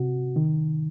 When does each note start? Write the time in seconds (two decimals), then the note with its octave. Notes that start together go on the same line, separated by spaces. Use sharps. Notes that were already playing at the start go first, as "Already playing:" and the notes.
Already playing: C3 F#4
0.36 D#3